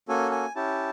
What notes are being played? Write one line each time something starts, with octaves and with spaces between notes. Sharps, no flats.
A#3 C#4 F#4 A4 G#5
G#5
C#4 E4 G4 A5